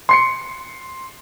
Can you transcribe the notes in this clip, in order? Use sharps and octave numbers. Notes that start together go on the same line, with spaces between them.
C6 C7 C#7